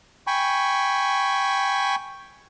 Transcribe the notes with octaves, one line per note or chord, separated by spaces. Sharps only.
G5 G#5 B5 C#6